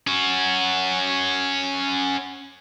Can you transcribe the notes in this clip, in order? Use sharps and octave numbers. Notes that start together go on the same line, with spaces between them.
C#4 F#4